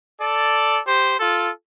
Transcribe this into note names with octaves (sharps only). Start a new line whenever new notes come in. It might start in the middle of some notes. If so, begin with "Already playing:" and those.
A4 D5
G4 C5
F4 A4